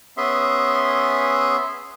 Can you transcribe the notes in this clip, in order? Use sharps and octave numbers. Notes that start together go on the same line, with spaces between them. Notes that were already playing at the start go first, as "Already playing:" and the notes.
B3 C#4 G#4 E5 C6